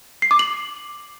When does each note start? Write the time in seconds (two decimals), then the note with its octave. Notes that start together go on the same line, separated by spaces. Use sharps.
0.22 C7
0.31 D6
0.39 F#7